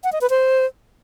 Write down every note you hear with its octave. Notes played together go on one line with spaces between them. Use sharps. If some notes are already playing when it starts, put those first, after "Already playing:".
F#5
D#5
B4
C5